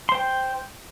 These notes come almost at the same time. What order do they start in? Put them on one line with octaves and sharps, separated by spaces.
C6 C5 G5